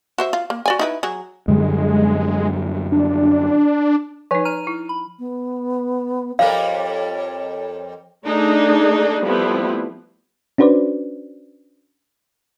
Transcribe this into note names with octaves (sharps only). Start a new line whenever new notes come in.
F#4 C5 E5
F4
A#3
F#4 D5 G#5
D#4 E4 B4
F#3 G#4
F#2 D3 G3 G#3
D4
F3 D#4 B4 C#5 G#5
A#5 F6 D#7
E4
B5
B3
F2 G3 A#4 C#5 F5
A3 D4 D#4 G#4
F3 G3 A3 B3 C4 E4
C#4 D4 F#4 B4 C5 D5